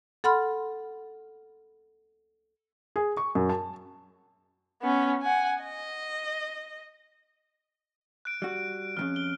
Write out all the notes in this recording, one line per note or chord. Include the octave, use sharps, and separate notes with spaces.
A4 F#5 B5 C6 F6
G#4
C#6
F#2
A5
B3 C#4
F#5 G#5
D#5
F#6 D7
G3 F#4
F2 A2 C#3 F6
G7